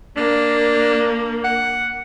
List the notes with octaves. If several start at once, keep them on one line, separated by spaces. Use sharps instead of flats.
A#3 D4
F#5